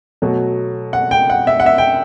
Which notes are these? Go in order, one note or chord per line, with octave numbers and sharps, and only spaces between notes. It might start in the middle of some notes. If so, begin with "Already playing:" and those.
B2 F#3 A3
F#5
G5
F#5
E5
F#5
E5
G5